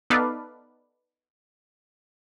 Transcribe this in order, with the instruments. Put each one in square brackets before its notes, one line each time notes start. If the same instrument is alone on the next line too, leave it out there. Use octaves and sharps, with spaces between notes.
[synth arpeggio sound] B3 D#4 A4 B4 D5 F5